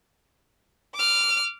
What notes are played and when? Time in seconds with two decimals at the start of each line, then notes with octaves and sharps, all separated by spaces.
0.94 D6 F6